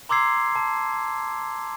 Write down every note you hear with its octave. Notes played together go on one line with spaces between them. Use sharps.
A#5 C6 D6 E6 G#6 C7
A5